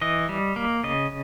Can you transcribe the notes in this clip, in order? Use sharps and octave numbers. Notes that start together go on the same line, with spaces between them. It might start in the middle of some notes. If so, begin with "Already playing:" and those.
E3 D#5
G3
A#3
C#3 D#5